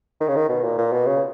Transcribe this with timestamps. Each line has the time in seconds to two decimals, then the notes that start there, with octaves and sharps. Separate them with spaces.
0.20 D#3
0.28 C#3
0.36 D#3
0.49 B2
0.63 A#2
0.78 A#2
0.92 B2
1.06 C#3